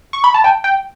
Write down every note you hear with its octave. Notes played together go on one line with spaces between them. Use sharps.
C#6
B5
A5
G5
G5